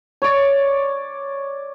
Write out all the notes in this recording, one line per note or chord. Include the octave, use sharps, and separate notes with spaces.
C#5 D5